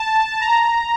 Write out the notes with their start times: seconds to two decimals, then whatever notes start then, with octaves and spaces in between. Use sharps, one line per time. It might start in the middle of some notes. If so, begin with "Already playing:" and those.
Already playing: A5
0.41 A#5